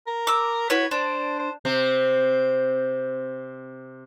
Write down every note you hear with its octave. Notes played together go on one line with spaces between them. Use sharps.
A#4
D6 E6
E4 F#4 B4 C#5
D4 C5
C5
C3 C4